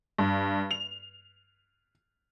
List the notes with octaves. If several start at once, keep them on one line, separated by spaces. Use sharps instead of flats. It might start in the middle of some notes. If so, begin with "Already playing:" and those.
G2
F7